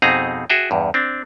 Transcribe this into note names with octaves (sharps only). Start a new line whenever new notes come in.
F2 B2 C4 D#4 G#4 A#5
F#4 G#4 E5 G5
E2 G2
C4 D4